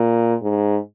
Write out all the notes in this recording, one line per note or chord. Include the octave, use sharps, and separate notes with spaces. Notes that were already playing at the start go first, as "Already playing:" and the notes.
Already playing: A#2
G#2